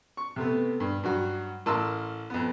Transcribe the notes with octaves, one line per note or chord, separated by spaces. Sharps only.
C#6
C3 A3 B3
G2
G2 F#3 F#4
A1 A#4 A5 C6 E6
F2 B3